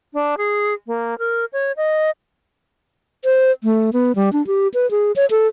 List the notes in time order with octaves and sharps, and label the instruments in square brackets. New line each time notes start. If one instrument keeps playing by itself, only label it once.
[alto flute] D4
G#4
A#3
A#4
C#5
D#5
[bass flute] C5
A3
B3
G3
D4
G4
B4
G#4
C#5
A4